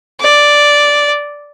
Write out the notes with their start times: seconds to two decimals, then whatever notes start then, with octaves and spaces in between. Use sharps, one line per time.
0.20 D5